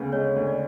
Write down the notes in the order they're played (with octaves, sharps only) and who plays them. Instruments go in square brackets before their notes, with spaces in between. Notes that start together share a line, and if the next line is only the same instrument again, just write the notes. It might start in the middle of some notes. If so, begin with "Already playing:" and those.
Already playing: [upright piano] D2 C#3 B3
[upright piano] G#3 [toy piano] C#5
[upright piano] D2
[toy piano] D5